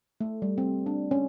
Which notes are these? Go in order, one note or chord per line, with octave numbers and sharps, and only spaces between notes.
A3
G3
C4
D4
C#4